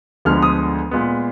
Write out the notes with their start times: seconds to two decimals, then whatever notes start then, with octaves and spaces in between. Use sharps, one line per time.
0.25 D2 D3 F3 G#3 B3 F6
0.42 D#6
0.91 A#2 G#3 B3